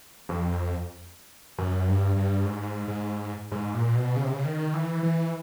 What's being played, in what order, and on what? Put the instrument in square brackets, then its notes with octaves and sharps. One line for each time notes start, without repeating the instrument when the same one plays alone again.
[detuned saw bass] F2
F#2
G2
G2
G#2
G#2
G#2
A#2
B2
C#3
C3
C#3
D#3
E3
E3